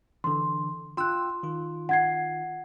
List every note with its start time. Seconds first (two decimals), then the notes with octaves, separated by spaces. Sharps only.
0.24 D3 E3 C6
0.97 F4 G5 C6 E6 F#6
1.43 D#3 F4
1.89 F#5 G#6 C7